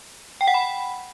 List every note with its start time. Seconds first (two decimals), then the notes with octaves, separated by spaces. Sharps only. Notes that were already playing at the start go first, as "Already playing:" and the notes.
0.41 G5
0.47 F#5
0.54 B5